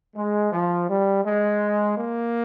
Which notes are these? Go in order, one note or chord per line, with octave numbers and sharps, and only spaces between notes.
G#3
F3
G3
G#3
A#3